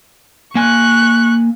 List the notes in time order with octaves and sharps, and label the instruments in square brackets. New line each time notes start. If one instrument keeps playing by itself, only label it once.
[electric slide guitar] A#3 G#5 [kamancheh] C#6 F#6